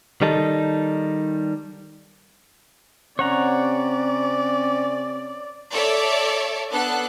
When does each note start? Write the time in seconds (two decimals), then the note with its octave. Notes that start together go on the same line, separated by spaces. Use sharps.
0.22 D#3 G3 D#4 A4
3.19 C3 C4 C#4 C#5 D5 F#5 A#5
5.72 A4 C#5 D5 E5
6.71 B3 D4 A4 F#6